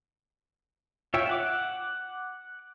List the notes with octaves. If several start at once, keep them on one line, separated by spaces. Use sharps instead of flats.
F4 C#5 E5 G5
F#5 D6